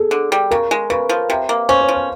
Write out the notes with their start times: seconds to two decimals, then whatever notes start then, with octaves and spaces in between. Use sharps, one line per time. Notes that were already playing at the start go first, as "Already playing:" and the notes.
Already playing: G#4 A4
0.11 D3
0.32 G3
0.51 C#3 A#4
0.71 G#3
0.90 C#3 B4
1.09 F3
1.30 C3
1.49 A#3
1.69 C#4 C5
1.81 C#5
1.88 F3
1.95 C5